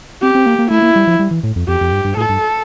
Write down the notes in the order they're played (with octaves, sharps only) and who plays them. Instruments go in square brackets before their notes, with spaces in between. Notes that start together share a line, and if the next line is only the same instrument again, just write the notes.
[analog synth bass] C4 [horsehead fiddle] G4
[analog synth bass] C4
A#3
A#3
[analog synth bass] A3 [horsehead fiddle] E4
[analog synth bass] A#3
G3
F3
G3
E3
A2
F2
[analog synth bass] F2 [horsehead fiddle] G4
[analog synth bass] F2
G2
G2
[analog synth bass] A2 [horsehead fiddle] A4
[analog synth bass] G2